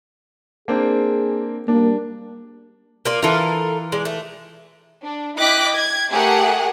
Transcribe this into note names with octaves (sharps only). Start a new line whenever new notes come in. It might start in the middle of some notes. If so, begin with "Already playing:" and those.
A#3 C4 D4 G#4
G3 A#3 D4
A#3 F4 D5
E3 F4 A4 A#4
G#3 D5
A3
D4
E4 D#5 G5 D6 F#6 B6
G#6
A3 G4 G#4 A#4 F#5